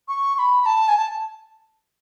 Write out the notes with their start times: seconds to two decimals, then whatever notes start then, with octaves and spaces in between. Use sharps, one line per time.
0.08 C#6
0.35 C#6
0.39 B5
0.62 B5
0.66 A5
0.89 G#5
0.97 A5